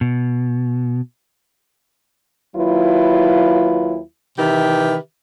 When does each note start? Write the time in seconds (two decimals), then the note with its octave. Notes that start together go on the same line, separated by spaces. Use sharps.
0.01 B2
2.56 D#2 F#3 E4 F4 B4
4.38 C3 D#3 E3 G4 B4 E5